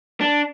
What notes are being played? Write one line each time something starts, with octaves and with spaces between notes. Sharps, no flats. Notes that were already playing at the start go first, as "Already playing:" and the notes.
D4